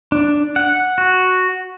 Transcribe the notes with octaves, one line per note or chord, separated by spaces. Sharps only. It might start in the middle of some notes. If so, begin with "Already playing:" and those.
D4
F#5
F#4